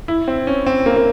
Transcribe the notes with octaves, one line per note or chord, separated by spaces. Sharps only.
E4
C4
C#4
C4
A#3
A#3